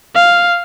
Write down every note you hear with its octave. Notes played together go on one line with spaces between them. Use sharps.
F5